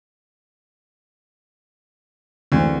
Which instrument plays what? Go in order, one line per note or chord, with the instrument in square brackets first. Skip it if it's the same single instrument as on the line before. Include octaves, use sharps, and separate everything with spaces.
[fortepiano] D2 [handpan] E3 G#3 C4